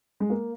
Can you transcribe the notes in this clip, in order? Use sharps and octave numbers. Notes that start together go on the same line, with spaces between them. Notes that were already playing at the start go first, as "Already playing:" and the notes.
G#3
A#3